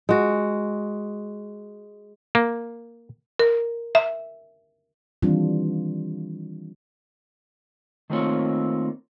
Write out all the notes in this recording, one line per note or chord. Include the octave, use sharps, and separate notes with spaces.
G#3 F#4
A#3
A#4
E5
D#3 E3 G3 C4 D4 F4
D#3 A3 A#3 C4 F4 C#5